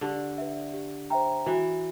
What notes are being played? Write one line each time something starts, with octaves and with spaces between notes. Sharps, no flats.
D3 G4
B4 E5
G4
C5 E5 G5 A#5
E3 F#4